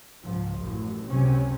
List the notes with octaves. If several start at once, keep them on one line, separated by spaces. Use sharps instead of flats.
C#2 G#2 F3
A1 F#2
C#2 F#2 C3 C#4